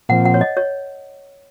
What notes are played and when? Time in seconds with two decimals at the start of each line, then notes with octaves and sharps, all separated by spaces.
0.09 A#2 F3 C4 F#5
0.25 F#5
0.34 C#5
0.41 D#5
0.57 C#5